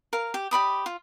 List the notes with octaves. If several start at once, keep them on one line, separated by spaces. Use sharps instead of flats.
A#4 F5
G4
G4 D5 B5 D#6
F4